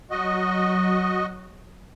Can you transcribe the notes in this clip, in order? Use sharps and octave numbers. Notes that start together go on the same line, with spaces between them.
F#3 F#4 D#5